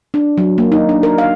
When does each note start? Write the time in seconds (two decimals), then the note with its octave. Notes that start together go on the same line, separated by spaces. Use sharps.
0.14 D4
0.38 F#3
0.58 A#3
0.72 D#4
0.89 D4
1.03 A#4
1.18 F5